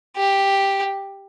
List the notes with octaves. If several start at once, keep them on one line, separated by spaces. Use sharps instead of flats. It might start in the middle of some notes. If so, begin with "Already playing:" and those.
G4